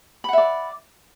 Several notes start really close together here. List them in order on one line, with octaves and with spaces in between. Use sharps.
B5 F#5 E5 D5